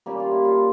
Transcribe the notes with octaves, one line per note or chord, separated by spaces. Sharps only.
A#2 G3 A#3 C#4 G4
F4
E4
F4